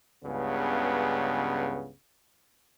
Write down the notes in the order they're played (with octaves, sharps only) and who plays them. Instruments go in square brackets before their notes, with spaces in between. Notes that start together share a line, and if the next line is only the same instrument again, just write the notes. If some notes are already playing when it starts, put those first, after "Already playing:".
[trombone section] C#2 G2 C#3 B3